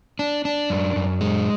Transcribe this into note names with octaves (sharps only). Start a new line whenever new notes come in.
D4
D4
F#2
F#2
G#3